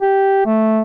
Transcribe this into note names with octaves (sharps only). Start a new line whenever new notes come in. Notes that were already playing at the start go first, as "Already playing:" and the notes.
G4
A3